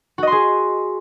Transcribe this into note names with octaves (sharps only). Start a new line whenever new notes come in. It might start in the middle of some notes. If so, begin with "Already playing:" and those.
F#4 G#4 D#5 C6